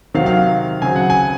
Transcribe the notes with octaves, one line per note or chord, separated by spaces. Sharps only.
C3 D#3 F#3 C4 F5
F5
C#3 F#3 C4 G#5
F#5
G#5